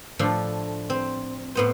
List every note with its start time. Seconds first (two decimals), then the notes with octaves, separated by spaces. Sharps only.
0.19 A2 F3 D4 A4
0.90 C4
1.55 A2 B3 C5